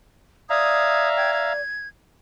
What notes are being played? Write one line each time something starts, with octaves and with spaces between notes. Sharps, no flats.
D5 E5 F5 A#5 D#6 G#6
G5 G#6
G#6